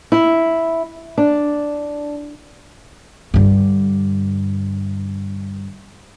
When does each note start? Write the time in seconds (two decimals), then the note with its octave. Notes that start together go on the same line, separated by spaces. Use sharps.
0.12 E4
1.18 D4
3.34 G2 D3